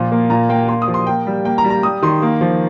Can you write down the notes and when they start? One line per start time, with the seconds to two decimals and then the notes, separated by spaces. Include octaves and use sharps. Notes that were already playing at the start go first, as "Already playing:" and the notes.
Already playing: A#2 F3
0.12 A#3
0.30 A#2 A#5
0.49 A#3 G5
0.68 A#3 C6
0.82 D#6
0.88 F3
0.94 C6
1.07 A#3 G5
1.27 G3
1.45 A#3 G5
1.58 A#5
1.64 G3
1.70 A#5
1.83 G3 D#6
2.03 D#3 C6
2.22 A#3
2.41 F3